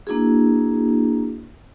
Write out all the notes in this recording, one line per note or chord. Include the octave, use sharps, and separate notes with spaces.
A#3 D4 E4 F#4 G#4